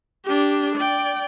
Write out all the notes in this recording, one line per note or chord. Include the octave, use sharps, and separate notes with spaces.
D4 G4
D5 G5